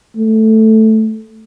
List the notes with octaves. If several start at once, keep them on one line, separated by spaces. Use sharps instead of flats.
A3